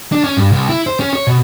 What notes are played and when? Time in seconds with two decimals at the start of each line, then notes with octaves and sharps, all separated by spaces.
0.12 D4
0.24 C#4
0.37 G2
0.52 C2
0.69 E4
0.87 C5
1.00 C#4
1.13 C#5
1.27 B2